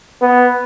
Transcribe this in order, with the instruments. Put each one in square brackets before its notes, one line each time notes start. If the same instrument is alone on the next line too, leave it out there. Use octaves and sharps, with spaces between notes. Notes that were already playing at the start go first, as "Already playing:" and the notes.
[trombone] B3